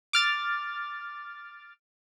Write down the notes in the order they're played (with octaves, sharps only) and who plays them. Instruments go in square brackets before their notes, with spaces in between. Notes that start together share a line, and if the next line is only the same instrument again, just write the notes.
[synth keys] D6 F6 A6